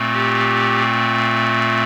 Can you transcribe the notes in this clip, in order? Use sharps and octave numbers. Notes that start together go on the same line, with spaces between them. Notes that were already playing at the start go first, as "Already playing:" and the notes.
Already playing: A#2 A3 C4
G4